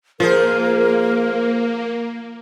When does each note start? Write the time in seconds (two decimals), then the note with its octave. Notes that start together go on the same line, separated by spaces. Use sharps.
0.20 F3 A#3 F4 G#4 A#4 C5